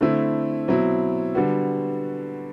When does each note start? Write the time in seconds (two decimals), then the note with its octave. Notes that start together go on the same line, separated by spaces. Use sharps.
0.01 D3 A3 C4 E4
0.68 B2 F#3 C4 E4
1.35 D3 G3 B3 F#4